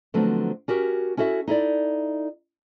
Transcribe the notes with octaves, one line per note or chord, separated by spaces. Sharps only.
D3 F3 F#3 A3 B3 C4
C#4 F#4 G4 A#4
C#4 E4 F#4 A4 E5
D#4 E4 A4 D5